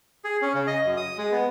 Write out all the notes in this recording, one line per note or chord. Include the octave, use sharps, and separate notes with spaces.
G#4
C#4
C#3
D#5
F#2
D#6
G#3
B3